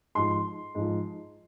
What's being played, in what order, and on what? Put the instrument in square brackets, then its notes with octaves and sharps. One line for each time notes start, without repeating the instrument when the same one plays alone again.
[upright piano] G#2 F3 C6
G#2 F3